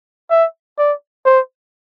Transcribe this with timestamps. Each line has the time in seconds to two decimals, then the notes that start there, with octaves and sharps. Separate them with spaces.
0.31 E5
0.78 D5
1.26 C5